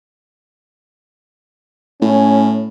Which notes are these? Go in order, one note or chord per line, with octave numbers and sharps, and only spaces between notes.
A2 C#4